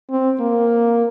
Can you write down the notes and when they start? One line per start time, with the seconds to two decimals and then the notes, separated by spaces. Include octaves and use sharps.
0.10 C4
0.40 A#3